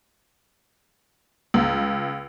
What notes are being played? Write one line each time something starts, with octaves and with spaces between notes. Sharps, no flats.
C#2